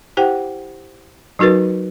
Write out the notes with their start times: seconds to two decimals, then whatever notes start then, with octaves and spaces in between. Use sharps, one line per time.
0.17 E4 G4 C5 F#5 G5
1.39 F#3 D#4 F#4 A#4 B4